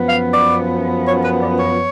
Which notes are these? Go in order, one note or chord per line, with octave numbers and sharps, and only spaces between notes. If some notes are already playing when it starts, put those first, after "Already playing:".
Already playing: F#2 F3 B3
F5
D5
C#5
B4
D5
C#5